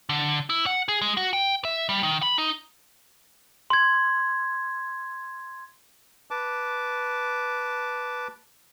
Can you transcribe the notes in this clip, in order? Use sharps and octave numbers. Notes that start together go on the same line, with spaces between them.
D3
E4
F#5
G#4
G#3
F#4
G5
E5
G3
D#3
B5
D#4
C6 G#6
B4 A5 D6